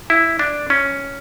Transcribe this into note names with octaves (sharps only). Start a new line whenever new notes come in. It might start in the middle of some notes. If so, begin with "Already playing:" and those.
E4
D4
C#4